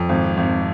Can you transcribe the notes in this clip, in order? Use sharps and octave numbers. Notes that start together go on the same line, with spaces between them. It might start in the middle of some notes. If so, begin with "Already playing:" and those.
Already playing: F2
G#1
G#1